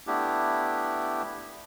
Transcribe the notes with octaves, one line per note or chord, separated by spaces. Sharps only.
A3 B3 D4 E4 G4